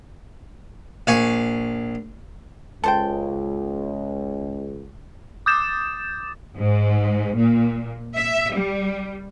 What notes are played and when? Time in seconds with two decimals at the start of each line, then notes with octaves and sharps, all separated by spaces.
1.07 A#1 F5 G#5 C#6
2.84 C#2 A4 C5 G5
5.46 D6 D#6 G6 A6 E7
6.57 G#2
7.36 A#2
8.18 E5
8.53 G3